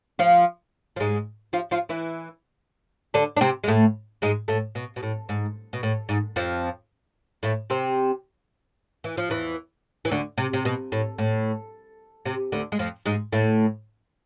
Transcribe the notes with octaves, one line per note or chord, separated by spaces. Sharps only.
F3 F4
F3
G#2 G#3
F3 F4
F3 F4
E3 E4
D3 D4
D4
C3 C4
G#3
A2 A3
G#2 G#3
A2 A3
B2
B2
A2
G#2
B2
A2
G#2
F2 F3
A2 A3
C3 C4
E3
F3
E2 E3
E3
D2 D3
C3
C3
B2
A2
A2
C3
D2 D3
G#3
F2 F3
G#2 G#3
A2 A3